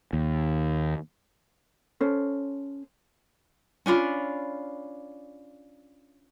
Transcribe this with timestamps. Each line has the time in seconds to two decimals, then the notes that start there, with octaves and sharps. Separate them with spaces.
0.13 D#2
2.00 C#4 A4 C5
3.86 C#4 D4 F4 B5